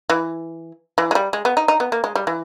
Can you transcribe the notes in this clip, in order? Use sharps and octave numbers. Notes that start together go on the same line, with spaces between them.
E3
E3
G#3
G3
G#3
B3
D#4
D#4
B3
A#3
G#3
G3
E3